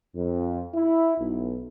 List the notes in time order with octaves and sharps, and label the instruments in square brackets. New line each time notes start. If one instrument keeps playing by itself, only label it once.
[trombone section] F2
E4
B1